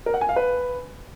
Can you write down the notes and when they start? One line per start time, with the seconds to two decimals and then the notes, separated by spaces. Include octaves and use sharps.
0.06 A#4
0.14 F#5
0.21 G#5
0.29 F5
0.36 B4